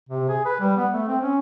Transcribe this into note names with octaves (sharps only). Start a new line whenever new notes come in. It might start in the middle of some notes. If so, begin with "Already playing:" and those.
C3
G#4
B4
G3
B3
A3
C4
C#4